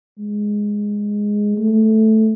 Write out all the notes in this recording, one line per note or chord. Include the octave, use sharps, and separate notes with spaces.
G#3
A3